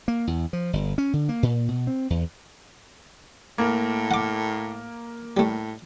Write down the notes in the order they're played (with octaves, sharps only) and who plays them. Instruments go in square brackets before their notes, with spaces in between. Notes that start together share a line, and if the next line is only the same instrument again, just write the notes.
[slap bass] A#3
E2
F3
G1
C#4
D3
A#3
A#2
B2
C4
E2
[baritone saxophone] A2 [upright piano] A#3
[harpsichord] F#5 D6
[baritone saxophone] A2 [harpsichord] G3 A3